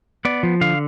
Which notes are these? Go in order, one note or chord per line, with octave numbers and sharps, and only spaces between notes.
B3 D5
F3
D3 F5